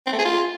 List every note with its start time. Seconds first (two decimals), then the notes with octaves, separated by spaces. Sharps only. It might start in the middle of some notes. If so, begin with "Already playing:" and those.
0.06 C4
0.13 A3
0.19 G#4
0.25 F4